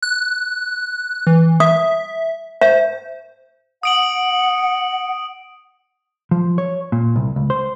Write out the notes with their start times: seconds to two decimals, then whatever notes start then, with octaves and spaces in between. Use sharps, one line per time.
0.02 F#6
1.27 E3
1.60 E5 D#6
2.61 C5 E5
3.83 F#5 D#6 D7 F#7
6.31 F3
6.58 C#5
6.92 A#2
7.16 C2
7.36 C#2
7.50 C5